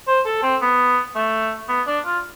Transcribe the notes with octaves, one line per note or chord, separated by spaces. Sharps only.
C5
A4
C4
B3
A3
B3
D4
F4